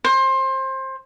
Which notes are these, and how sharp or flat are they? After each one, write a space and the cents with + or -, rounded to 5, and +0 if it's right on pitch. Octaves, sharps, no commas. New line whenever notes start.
C5 +25